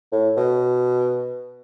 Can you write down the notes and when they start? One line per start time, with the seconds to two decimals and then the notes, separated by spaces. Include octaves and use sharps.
0.12 A2
0.37 B2